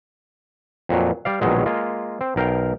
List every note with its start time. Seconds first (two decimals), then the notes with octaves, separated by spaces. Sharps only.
0.89 F2 A#2 F#3
1.25 G3 D5 F5
1.41 A#1 B2 D#3 F#3 G#3
1.66 G#3 A#3 F4
2.21 C4
2.36 B1 A#4 F5 G5